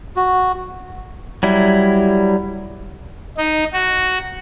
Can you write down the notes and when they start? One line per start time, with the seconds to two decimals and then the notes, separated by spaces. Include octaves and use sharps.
0.16 F#4
1.43 F#3 G3 E4
3.38 D#4
3.73 F#4